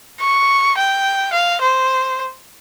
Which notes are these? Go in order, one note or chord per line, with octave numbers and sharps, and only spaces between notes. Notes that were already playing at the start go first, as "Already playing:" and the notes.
C#6
G5
F5
C5